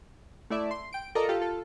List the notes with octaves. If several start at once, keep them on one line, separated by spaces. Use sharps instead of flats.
A3 E4 D5 E5
C6
G5 D7
F4 A4 A#4 D5 D#5 A#5
F4 G4 A4
F4 A4